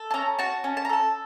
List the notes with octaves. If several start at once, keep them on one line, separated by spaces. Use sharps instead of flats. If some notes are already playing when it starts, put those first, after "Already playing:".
Already playing: A4
A5
C#4 A#5
F#4 A5
C#4
A5
A#5
A4 A5